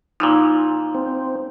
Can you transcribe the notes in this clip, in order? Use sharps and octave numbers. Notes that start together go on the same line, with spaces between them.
A#2 E3 F3 D#4
C4